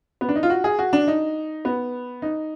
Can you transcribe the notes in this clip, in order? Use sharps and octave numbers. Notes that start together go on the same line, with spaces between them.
B3
D4
D#4
F4
F#4
G#4
F#4
D4
D#4
B3
D#4